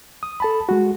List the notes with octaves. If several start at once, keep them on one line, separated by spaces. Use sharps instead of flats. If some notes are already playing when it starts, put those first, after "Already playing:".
D#6
A4 A5 B5
G#3 F#4